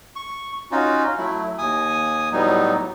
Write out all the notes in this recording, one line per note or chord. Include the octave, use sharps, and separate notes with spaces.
C#6
C#4 D#4 F4 F#4
F#3 A3 E4
D#2 G#5 D#6
A2 F#3 G3 B3 D#4